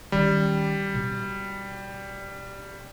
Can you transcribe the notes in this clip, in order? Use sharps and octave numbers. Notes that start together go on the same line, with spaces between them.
D#3 G3 C#4
B2